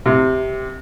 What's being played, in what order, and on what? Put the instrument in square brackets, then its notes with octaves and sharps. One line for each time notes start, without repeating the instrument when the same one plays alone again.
[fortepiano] C3